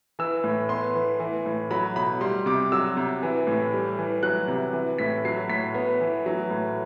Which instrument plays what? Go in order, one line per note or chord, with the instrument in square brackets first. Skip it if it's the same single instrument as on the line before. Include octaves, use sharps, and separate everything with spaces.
[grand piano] E3 E6
A2
B3 C6
E3
E3
A2
F#3 B5
B2 B5
G3 C6
C3 D6
F#3 E6
C3
E3
A2
G3
E3
F#3 F#6
C3
E3
A2 B6
F#3 C7
A2 B6
B3
E3
F#3
A2